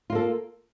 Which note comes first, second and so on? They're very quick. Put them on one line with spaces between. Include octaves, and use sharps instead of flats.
F4 A#3 A4